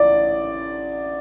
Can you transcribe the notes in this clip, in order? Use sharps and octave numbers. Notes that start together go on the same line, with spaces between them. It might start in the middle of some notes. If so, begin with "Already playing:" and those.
Already playing: A1 D5